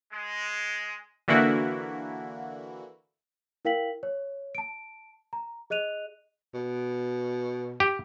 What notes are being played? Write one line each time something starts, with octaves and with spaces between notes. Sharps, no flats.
G#3
D3 E3 A#3 E4 F#4
E4 A#4 F5 G5 B6 F#7
C#5
A5 D7
A#5
G#4 D#5 F#6 D#7 F7
B2
G4